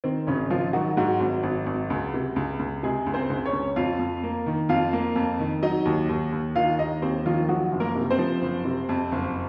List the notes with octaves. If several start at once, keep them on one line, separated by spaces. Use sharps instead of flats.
D#3 C4
G#1 C#3 C#4
G#1 F3 F4
D#3 F#3 F#4
G#2 F#3 F#4
G#1
G#1
G#1
C#2
C3
C#2
C#2
C3 G#3 G#4
C#2
C4 C5
C#2
C#4 C#5
C#2
F2 F4 F5
F2
A#3
D#3
F2 F4 F5
A#3
F2
D#3
F#3 D#4 D#5
D#2
D#2
D#2
D#3 F4 F5
D#2 D#4 D#5
D#2 C4 C5
D#3 F3 F4
F3 F#3 F#4
F#1
A#3 A#4
C3
C4 C5
F3
F#1
C3
F2
F#1